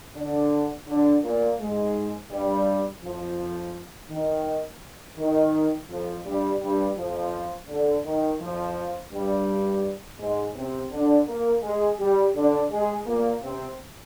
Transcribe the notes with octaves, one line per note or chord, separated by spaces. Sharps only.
D3 D4
D3 D4
A#2 A#3
G#2 G#3
G2 G3
F2 F3
D#3
D#3
F2 F3
G2 G3
G2 G3
F2 F3
D3
D#3
F2 F3
G2 G3
G#2 G#3
C3 C4
D3 D4
A#3 A#4
G#3 G#4
G3 G4
D3 D4
G#3 G#4
A#2 A#3
C3 C4